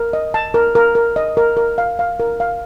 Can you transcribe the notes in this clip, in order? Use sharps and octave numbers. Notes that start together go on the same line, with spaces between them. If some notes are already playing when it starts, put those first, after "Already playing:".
Already playing: A#4
D#5
A5
A#4
A#4
A#4
D#5
A#4
A#4
F5
F5
A#4
F5